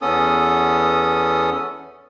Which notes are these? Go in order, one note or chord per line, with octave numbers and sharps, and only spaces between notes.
E2 B3 C#4 A4 D#6